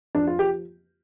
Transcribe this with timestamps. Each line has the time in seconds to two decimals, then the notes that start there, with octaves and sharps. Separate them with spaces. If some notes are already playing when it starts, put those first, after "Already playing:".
0.15 F2 D4
0.27 F4
0.39 F3 G4